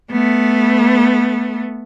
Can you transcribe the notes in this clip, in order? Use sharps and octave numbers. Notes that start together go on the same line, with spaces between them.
A3 B3